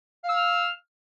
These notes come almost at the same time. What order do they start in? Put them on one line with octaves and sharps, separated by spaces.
F5 E6 F6